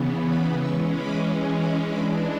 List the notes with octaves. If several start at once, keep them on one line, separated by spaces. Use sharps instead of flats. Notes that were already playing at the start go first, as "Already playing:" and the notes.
Already playing: C#3 E3 B3
B5 D6
E3 G#3 C#4 C#6 E6
B5 D6
B5 D6
E3 G#3 D4 B5 D6